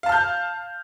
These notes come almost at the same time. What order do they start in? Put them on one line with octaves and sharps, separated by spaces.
F5 A5 F6 G6